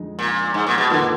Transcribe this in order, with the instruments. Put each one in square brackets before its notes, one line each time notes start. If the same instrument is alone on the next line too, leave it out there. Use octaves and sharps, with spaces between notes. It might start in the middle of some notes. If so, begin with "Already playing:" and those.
Already playing: [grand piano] F2 D3 G#3 D#4
[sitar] A#2
G#2
A#2
B2
[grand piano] F2 D#3 A#3 F4 B4 [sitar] D3